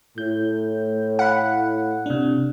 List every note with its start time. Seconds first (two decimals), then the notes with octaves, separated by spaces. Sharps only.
0.18 A2 G6
1.19 F5 F#5 B5
2.06 C3 D4